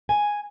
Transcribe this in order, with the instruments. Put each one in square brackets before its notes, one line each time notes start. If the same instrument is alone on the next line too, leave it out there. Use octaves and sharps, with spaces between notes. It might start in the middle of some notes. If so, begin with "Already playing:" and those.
[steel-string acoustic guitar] G#5